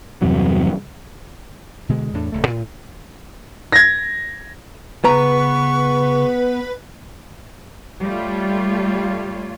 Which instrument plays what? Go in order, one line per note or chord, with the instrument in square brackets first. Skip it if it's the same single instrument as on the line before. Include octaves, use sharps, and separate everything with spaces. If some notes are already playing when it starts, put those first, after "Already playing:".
[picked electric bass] E2 G2 C3 F#3
[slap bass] B2 D3 G#3
E2 A2 D4
D#1 C#2 A3
A2
[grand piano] G#6 A#6
[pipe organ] C#3 [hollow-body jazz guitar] B3 A#5 [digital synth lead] B4 [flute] C#6
[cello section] G3 A3 F4 C#5